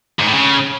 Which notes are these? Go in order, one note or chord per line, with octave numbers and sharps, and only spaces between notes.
G#2
A2
C#3